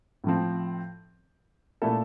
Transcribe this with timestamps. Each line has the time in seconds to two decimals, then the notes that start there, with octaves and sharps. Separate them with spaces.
0.24 A2 F3 C4
1.82 A#2 A3 E4 A4